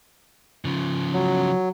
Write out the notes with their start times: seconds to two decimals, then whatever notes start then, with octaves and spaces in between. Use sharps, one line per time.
0.65 C#3 F3
1.13 F#3